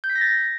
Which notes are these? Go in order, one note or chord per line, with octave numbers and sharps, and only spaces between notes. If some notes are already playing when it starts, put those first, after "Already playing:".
G6
B6
A#6
A6